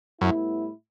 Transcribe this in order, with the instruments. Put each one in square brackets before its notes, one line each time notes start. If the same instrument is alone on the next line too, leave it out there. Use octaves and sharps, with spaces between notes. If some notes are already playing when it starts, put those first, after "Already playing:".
[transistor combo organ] F#2 [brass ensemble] A2 G3 B3 E4